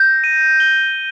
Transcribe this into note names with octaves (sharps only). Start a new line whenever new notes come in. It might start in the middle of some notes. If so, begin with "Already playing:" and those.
Already playing: G6 A#6
D#7
G7